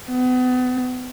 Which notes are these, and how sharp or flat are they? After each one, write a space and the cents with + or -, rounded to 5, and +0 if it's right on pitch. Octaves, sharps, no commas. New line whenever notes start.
B3 +35